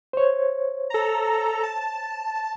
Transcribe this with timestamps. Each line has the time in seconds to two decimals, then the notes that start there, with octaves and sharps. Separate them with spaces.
0.13 C5 C#5
0.90 A4 A#5
1.63 A5